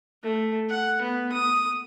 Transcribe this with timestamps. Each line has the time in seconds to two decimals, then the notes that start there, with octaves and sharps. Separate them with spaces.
0.23 A3
0.69 F#5
1.02 B3
1.32 D#6